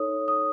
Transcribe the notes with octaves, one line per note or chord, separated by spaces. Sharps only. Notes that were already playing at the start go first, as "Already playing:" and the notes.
Already playing: D#4 A4 C#5 D#6
D#6